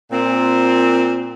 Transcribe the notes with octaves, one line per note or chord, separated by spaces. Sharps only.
A#2 C4